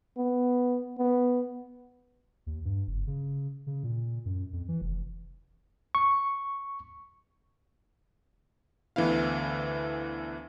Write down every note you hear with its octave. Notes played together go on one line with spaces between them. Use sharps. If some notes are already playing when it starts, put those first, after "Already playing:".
B3
B3
D#2
G2
F#1
C#3
C#3
A#2
F#2
F2
E3
F1
C#6
D2 D3 E3 B3 E4 F5